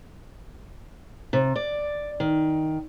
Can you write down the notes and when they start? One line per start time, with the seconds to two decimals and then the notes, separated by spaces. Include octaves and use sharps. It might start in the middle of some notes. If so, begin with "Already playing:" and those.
1.33 C3
1.55 D5
2.20 D#3